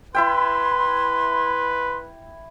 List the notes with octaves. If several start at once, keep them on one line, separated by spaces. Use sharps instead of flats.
E4 B4 E5 G5 C6